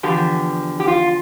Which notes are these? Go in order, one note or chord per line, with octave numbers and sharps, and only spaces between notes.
E2 D3 F3 G4
G4
F4